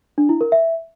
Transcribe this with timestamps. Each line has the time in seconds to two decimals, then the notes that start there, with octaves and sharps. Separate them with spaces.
0.18 D4
0.29 E4
0.41 A#4
0.52 E5